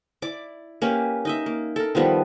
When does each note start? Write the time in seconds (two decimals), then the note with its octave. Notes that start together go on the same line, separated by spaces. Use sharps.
0.22 E4 D5 D6
0.82 A#3 C#4 G4 B4
1.25 D#4 D#5 E5
1.46 A#3
1.76 A4 A#4
1.95 D#3 F3 G3 B3